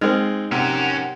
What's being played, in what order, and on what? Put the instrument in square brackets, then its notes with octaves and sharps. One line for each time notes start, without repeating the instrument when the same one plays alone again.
[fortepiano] G#3 C4 [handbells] D#4
[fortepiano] C3 [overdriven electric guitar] C#4 A#4 [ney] F#5